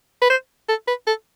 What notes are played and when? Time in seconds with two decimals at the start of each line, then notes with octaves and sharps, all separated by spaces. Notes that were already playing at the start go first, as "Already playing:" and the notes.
0.22 B4
0.30 C5
0.69 A4
0.88 B4
1.07 A4